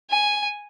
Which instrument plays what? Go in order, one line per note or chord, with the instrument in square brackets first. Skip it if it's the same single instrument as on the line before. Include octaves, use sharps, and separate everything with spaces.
[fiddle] G#5